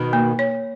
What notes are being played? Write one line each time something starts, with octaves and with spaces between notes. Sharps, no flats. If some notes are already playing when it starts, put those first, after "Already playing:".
Already playing: B2 D#3
A#3
C#5